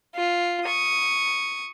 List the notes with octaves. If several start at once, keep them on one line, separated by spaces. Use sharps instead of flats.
F4
C#6 D#6